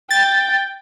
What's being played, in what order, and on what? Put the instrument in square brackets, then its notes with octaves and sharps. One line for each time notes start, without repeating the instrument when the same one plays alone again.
[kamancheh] G5 [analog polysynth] A6